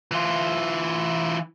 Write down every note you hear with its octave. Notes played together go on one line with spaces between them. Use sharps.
E3 F4